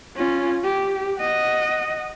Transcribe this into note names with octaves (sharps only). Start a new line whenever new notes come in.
C#4 F4
G4
D#5 F#5